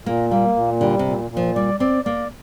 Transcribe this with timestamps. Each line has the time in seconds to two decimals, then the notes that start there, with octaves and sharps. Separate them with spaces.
0.06 A#2 A#3
0.31 G3 A#3
0.56 A#2
0.80 D3 G3
0.99 C3
1.06 A#2
1.31 A#2
1.37 F3
1.56 G3 D5
1.80 C4 D5
2.05 A#3 D5